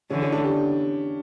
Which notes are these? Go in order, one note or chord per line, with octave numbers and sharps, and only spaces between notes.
D3 E3 C#4
C#4
D4
G4